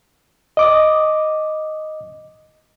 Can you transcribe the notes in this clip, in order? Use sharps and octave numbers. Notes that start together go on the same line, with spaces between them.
D#5 D6 D#6